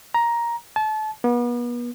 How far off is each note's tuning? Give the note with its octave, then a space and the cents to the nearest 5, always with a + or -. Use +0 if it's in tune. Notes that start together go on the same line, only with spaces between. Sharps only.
A#5 +10
A5 -30
B3 -35